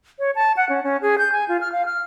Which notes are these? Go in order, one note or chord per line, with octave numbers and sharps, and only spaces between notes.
C#5
A5
F#5
C#4
C#4
G#4
G6
G#5
F4
F6
F5
F6